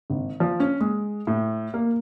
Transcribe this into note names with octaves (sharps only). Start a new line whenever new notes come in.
G#1
F3
C#4
G#3
A2
A#3